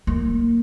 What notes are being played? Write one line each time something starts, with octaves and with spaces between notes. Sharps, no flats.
A#3